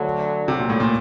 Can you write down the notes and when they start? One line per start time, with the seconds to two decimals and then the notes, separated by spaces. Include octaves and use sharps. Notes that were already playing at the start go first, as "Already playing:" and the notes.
Already playing: D2 D3 F#3
0.48 C3
0.59 A#2
0.69 A2
0.80 A#2